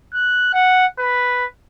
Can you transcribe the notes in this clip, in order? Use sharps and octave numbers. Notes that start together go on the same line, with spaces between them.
F#6
F#5
B4